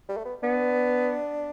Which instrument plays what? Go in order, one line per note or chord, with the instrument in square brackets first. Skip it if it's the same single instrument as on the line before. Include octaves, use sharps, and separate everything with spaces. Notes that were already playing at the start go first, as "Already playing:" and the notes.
[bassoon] G3
A3
B3
[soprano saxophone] B3 [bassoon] D4